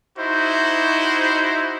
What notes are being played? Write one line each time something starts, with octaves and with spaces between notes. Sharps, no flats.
D#4 E4 F#4 C5